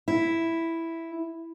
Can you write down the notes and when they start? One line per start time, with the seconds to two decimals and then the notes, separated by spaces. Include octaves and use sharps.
0.08 E4